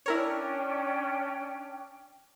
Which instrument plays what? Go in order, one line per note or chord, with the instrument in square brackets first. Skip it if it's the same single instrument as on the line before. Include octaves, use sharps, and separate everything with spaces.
[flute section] C#4 D4 G5 [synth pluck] E4 A#4 C#5